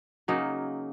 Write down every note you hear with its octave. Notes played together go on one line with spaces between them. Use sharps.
C#3 F#3 A#3 D#4